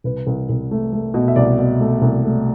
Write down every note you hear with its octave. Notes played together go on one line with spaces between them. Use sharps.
C2 B4
C2
C2
A3
A3
B2
E5
C2 D5
B2
A3
C2
A3